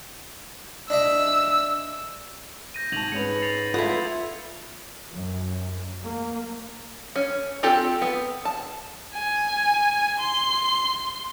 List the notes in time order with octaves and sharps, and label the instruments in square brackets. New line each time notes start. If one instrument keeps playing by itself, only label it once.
[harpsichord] D4 D#5 E5 [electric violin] E6
[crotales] G6 A#6 D#7
[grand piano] G#1 A5 [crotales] G#6 F7 F#7
[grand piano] G#2 C#4 B4 [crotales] C#7 F7
[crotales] A6 C7 F7
[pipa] B3 E4 [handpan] F4 A4
[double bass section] F#2
A#3
[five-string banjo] C#4
C4 F4 G4 A4
B3
A5
[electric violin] G#5
C6